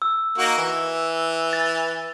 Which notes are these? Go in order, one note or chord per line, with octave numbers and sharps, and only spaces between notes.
E6
A#3 D#4 F#4
E3
A6